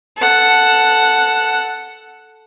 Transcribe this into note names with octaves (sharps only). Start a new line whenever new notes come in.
A4 F#5